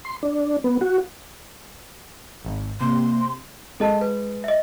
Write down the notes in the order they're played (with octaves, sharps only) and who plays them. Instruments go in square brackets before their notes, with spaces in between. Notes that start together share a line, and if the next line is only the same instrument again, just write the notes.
[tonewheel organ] C6
D4
B3
F#4
[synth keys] G#1
[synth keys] C3 [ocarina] A#3 [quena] C6
[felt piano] G#3 [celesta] A4 D#5 A5
[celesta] B4
D#5 E5